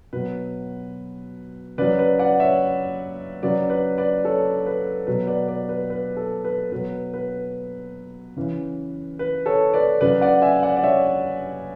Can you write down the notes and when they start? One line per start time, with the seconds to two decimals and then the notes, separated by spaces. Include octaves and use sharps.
0.13 B2 F#3 B4
1.78 C#3 F#3 B4 D5
1.99 B4 D5
2.19 D5 F#5
2.40 C#5 E5
3.43 C#3 F#3 B4 D5
3.70 B4 D5
3.98 B4 D5
4.25 A4 C#5
4.66 B4
5.07 B2 F#3 B4
5.27 B4 D5
5.48 B4 D5
5.69 B4
5.90 B4
6.17 A4
6.45 B4
6.72 B2 F#3 B4
7.14 B4
8.37 C#3 E3
9.19 B4
9.46 A4 C#5
9.74 B4 D5
10.01 C#3 F#3 B4 D5
10.21 D5 F#5
10.42 E5 G#5
10.63 D5 F#5
10.77 D5
10.83 C#5 E5